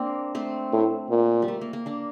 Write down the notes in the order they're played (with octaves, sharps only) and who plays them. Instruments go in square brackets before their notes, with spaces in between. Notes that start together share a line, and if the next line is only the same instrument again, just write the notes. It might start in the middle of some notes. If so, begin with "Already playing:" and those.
Already playing: [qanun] A#3 C4 D4
A3 C4
[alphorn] A2
A#2
[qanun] G3
A3
A#3
A#3
A#3 D4